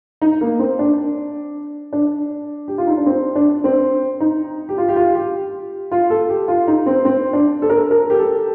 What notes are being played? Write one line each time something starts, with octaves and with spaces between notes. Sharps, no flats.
D#4
A#3
C4
D4
D4
G4
F4
D#4
D4
C4
D4
C4
D#4
G4
F4
G4
F4
G4
F4
A4
G4
F4
D#4
C4
C4
D4
A4
A#4
A4
A#4
G4
A4